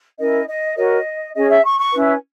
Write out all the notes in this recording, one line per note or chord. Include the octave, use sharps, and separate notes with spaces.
C#4 E4 A#4 D#5
D#5
F#4 A#4 C#5 D#5
C#4 G#4 C#5 D#5
E5
C#6
C#6
C#4 E4 B4